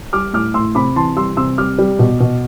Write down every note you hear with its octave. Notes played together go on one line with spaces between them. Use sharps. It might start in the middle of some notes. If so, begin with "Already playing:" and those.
G3 D6 F6
A2 D6 F6
A2 C6 E6
C3 B5 D6
E3 A5 C6
G3 C6 E6
C3 C6 E6
G3 D6 F6
G3
B2
B2